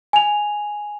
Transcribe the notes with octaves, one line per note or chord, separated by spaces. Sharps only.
G#5 F7